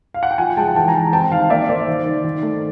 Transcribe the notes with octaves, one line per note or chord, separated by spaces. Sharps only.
F5
F#5
G5
F3 F#5 G#5
G#3 G5 A5
E3 G5 A5
G#5 A#5
E3
C4 G5 A5
D#3 F5 G5
A#3 D5 E5
A#3 C5 D5
D#3
D#3
D#3
A3